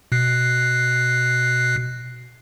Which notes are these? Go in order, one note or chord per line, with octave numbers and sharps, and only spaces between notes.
B2 F#6 C7